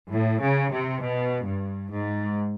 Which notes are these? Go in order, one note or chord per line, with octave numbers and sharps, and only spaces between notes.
A2
C#3
C3
B2
G2
G#2